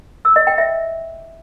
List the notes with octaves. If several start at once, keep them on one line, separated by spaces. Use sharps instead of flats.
E6
D#5
G5
E5